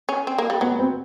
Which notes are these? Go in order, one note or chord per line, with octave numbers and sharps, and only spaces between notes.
C#4
C4
A#3
G3
F#3 B3
B3
C4